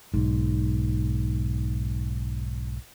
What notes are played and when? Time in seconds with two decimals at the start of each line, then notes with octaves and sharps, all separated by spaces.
0.14 B1 G#2